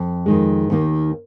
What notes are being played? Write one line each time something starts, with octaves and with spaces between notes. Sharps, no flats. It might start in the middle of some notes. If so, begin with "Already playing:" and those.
Already playing: F2
F2 D#3 G#3
D#2 D#3 A#3